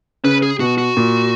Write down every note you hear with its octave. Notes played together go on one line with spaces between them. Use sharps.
C#3 B4
G#4
B2 F#4
F#4
A#2